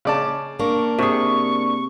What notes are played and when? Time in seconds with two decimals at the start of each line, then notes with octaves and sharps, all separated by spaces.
0.05 C#3 D5 A5
0.59 A#3 D4 C#6
0.98 C3 G#4 C#6